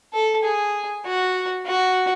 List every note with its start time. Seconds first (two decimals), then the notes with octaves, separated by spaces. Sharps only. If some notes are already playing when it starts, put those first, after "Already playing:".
0.13 A4
0.43 G#4
1.05 F#4
1.66 F#4